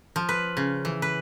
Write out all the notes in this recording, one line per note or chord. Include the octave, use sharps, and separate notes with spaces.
F3
B4
C#3
E3
B4